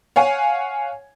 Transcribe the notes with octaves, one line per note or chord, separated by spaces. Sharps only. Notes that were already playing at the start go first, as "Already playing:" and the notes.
C#5 F5 F#5 G#5